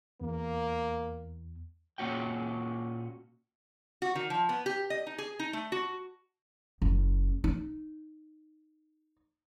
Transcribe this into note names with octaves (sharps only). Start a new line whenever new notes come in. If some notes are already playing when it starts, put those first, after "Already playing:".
E2 A#3
A#2 A#3 C#4 F#4 G5
F#4
D#3
F3
B3
G4
D#5
D#4
G#4
D#4
A3
F#4
F#1
D#4